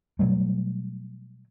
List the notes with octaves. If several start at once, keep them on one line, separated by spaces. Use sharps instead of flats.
B2 F#3 G3 A3